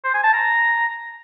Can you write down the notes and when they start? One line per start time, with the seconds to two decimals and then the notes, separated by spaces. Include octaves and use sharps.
0.04 C5
0.14 G#5
0.23 A5
0.33 A#5